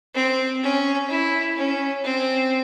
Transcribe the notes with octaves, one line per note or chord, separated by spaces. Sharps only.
C4
C#4
E4
C#4
C4